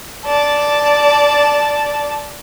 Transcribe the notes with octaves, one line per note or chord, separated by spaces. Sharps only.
D5 A5